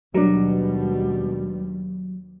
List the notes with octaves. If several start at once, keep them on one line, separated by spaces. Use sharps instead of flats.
D#2 B2 F#3 G3 D4 A#4